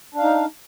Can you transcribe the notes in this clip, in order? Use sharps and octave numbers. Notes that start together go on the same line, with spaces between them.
D4 D#4 F5